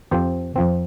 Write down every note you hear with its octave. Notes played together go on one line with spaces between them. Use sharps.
F2 F3 C4 G4 C5
F2 F3 C4